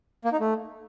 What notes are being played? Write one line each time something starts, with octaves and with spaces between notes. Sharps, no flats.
A#3
D#4
A3